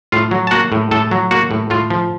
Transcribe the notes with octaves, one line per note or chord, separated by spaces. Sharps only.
A2 F4 F5
F#3
A5
A#3 F#4 F#5
A2
A2 A4 A5
F#3
A#3 F#4 F#5
A2
A2 F4 F5
F3